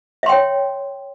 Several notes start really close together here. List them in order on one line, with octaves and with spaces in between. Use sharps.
E5 C6 G5 C#5